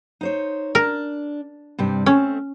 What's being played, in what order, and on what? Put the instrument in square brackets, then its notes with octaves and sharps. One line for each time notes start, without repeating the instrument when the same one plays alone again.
[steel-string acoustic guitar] D#4 C5 C#5
[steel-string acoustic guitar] D4 [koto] A#4
[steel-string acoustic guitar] G2 C3 G3
[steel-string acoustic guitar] A3 C4 [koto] C#4